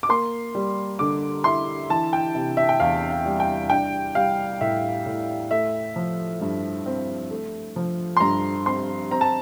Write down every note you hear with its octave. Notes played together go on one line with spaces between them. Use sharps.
D6
A#3 C6
G3
D3 D6
E4 C6
E3 A5
G5
C3
E5
G5
E2 F5
F5
G3
G5
D4 G5
G3 F5
A2 E5
A2
A3 E5
F3
G2
C4
A3
F3
C6
G2 A#5
C4 C6
C4 A#5
A5